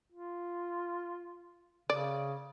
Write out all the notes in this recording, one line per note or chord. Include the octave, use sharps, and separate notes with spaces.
F4
C#3 D5